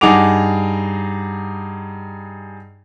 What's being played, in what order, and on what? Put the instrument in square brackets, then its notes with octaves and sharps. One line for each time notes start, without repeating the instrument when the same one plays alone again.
[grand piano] G2 D#4 G#4 F#5 D6 F7